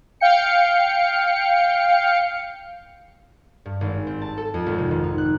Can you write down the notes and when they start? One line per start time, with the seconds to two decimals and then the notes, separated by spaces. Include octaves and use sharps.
0.20 F5 G5 C#7
3.66 G2
3.81 G#1
4.07 C4
4.22 A5
4.37 A4
4.54 F2
4.66 G#1
4.79 C3
4.91 D#3
5.03 D#4
5.18 F#6